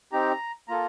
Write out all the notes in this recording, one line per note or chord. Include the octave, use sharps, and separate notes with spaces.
C4 D#4 G4 A#5
A#3 F4 A4 A#5